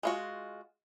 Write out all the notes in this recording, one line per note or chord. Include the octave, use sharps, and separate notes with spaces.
G#3 F4 F#4